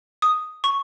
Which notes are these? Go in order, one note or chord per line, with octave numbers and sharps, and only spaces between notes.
D#6
C#6